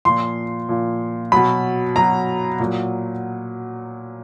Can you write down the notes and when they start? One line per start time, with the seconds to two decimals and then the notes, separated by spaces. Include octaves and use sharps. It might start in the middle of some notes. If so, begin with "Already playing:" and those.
0.05 A#2 F3 C6
0.69 A#2 F3
1.32 B2 F#3 B5
1.96 B2 F#3 A#5
2.60 A#2 F#3